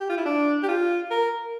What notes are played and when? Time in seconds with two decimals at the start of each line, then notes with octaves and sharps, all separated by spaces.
0.01 G4
0.09 F4
0.17 E4
0.26 D4
0.63 G4
0.69 F4
1.11 A#4